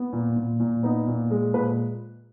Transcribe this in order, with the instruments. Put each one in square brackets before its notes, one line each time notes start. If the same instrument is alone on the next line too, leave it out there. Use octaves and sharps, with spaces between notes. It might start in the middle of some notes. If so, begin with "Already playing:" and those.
Already playing: [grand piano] B3
A#2
A#2
A#2
B3 D#4
A#2
G#3
A#2 B4